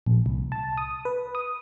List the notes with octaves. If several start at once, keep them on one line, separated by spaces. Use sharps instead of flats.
A#1
C2
A5
D#6
B4
D#6